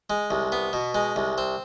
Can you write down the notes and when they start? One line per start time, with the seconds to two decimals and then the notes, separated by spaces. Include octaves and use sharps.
0.10 G#3
0.31 C2
0.52 B3
0.73 B2
0.95 G#3
1.16 C2
1.38 C4